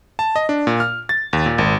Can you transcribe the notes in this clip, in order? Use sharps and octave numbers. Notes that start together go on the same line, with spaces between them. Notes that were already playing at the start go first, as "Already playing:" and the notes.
A5
D#5
D4
A#2
F6
A6
D#2
A#2
G#1